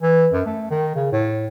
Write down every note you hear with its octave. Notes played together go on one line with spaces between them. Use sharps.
E3
F#2
A3
D#3
C#3
A2